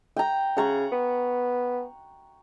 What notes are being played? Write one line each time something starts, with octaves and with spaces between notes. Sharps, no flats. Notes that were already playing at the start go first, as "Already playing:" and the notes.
G5 A#5
C#3 F#5 A#5 C#6
B3